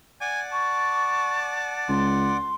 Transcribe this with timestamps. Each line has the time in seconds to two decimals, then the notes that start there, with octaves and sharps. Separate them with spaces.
0.21 D5 F#5 G#5 D6
0.52 A5 C#6
1.89 C#2 C6